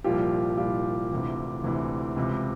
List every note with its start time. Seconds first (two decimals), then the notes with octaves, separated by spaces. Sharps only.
0.04 C2 A#2 F3 F4 G4
0.57 C2 A#2 F3 F4 G4
1.11 D2 C3 E3
1.64 D2 C3 E3
2.17 C#2 C3 E3